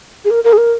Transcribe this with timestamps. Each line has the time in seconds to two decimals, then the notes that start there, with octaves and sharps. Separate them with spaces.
0.25 G#4
0.30 A#4
0.44 A#4
0.53 G#4
0.57 A#4